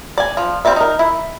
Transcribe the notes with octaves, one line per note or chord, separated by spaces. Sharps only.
D5 G#5
F3
G3 C4 E4 D5 E5
D#4 A#4
E4